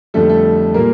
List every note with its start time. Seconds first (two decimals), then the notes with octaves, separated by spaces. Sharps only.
0.14 F2 D3 G3 A3 A4
0.29 A3 A4
0.74 A#2 G3 A#3 A#4